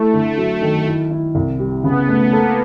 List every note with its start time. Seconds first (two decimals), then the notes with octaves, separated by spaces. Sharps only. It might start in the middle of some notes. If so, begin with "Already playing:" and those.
Already playing: A3 E4
0.14 D3
0.37 F#3 A3
0.62 D#3
0.86 E4
1.10 E4
1.35 C2
1.59 G3
1.84 C#3 B3
2.08 A3
2.32 A#3 A4